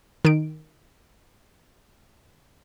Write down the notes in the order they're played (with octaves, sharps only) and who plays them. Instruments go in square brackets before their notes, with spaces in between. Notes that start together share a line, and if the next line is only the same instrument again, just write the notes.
[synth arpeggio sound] D#3 D7